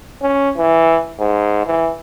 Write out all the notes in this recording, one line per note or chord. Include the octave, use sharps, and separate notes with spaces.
C#4
E3
G#2
E3